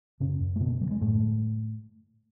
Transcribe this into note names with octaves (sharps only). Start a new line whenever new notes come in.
F#2 C#3 C#4
F#2
A3
B2 D3 B3
D3 F#3
G#3
F#2 A2 A3